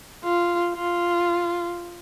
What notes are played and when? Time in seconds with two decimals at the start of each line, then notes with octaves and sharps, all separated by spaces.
0.24 F4
0.74 F4